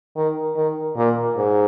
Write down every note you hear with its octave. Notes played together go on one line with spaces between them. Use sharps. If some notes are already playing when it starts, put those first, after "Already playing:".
D#3
D#3
A#2
G#2